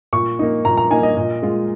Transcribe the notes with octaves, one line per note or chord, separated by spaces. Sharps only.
A#2 C#6
A#3 D#4
A#2 A#5
A#5
A#3 D#4 G#5
D#5
A#2
G#3 F4